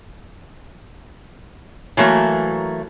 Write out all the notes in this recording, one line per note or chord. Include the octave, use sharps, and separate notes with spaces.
E3 F#3 A3 A#3